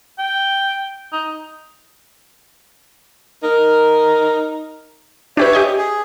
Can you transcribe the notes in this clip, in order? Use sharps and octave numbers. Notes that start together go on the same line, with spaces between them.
G5
D#4
D#4 A#4
D4 G4 B4 C#5 E5
G4 D#5 G#5
G#4